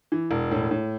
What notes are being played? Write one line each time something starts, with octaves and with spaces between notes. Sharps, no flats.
E3
E1
A2
A2